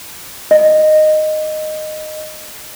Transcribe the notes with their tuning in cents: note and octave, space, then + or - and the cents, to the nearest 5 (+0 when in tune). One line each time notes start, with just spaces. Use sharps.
D#5 -10